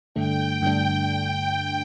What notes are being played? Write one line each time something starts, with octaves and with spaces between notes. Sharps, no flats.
G2 D3 A3 D4 G5
G2 D3 A3 D4 G5